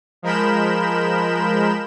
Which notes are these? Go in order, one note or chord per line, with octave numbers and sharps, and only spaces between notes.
F3 G#3 A#4 B5 G6 E7